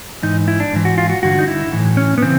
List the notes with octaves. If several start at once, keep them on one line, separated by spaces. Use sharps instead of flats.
G#2 E3 D#4
E4
D4
G#2 E3
F#4
F4
F#4
G2 D3 F#4
D#4
E4
A2 E3
C#4
B3
C#3 E3 C4